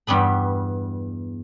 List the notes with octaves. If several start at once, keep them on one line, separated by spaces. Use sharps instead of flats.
E2 G2 G3 B3 B5